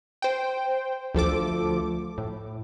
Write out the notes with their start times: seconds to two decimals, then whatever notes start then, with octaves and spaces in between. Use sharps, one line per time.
0.22 C5 G5
1.14 D2 F3 A4 D6
2.18 A2